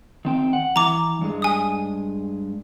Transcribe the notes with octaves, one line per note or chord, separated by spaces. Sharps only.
D#3 C4 G5
F#5
E3 A#5 D6
G2 G#3
G#5 D#6